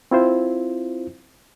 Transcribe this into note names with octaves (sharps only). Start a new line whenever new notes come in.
C4 E4 F4 C5